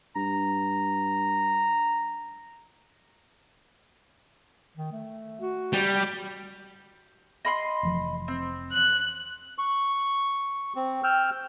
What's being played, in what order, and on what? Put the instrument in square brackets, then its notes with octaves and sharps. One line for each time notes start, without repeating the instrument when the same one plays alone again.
[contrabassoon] G2 [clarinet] A#5
[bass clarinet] D#3
A3
F#4
[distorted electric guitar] G3
[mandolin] D#5 B5 C6
[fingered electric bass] F1 E3 F3
[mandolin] C4
[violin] F#6
[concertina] C#6
C4
G5 E6 F6